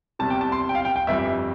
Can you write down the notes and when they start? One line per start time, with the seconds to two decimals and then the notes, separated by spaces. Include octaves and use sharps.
0.19 E2 C3 G3 A5
0.30 G5
0.41 A5
0.52 C6
0.69 G5
0.75 F5
0.85 G5
0.96 G5
1.07 G1 F2 E3 G3 E5